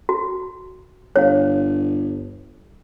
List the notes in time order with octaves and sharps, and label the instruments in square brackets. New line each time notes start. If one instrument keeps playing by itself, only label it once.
[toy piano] F#4
[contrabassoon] G1 [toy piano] C#5 F5